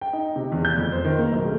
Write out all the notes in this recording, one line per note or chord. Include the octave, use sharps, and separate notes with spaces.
G5
D#4
C3
E2
G6
F2
C5
D#3
A#3
B1
A3